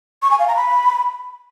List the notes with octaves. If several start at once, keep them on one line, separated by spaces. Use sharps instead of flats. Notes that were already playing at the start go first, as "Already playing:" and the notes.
C#6
G#5
F5
A#5
B5